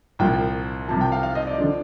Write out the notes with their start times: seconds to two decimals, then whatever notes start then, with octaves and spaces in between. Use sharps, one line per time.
0.19 C2 A#2 F3 G5
0.88 C2 C3 F3 A5
1.01 G5
1.12 F5
1.23 F5
1.35 D#5
1.47 D5
1.58 D3 F3